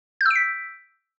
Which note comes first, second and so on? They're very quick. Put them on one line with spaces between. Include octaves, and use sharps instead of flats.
G6 E6 D7 B6